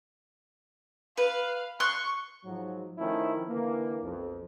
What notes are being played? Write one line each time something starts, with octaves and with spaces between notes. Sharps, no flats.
B4 F5
C6 C#6 F#6
G#2 F3 F#3
D#3 F3 A3 C#4 E4
D3 E3 A#3
B1 F2